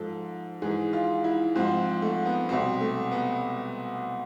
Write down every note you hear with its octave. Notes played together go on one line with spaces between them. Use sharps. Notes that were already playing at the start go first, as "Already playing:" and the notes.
Already playing: G#2 F3 A4
G#2 E3 G#4
F4
E4
G#2 F3 C4
A3
B3
C2 B2 C4
A3
B3